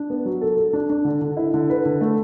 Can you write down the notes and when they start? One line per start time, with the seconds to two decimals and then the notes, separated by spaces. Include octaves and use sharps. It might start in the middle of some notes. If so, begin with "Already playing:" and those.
Already playing: D4
0.10 B3
0.25 F#3
0.41 A4
0.57 A4
0.73 D4
0.90 D4
1.05 D3
1.21 D3
1.37 E4
1.54 D3
1.70 B4
1.86 D3
2.01 A3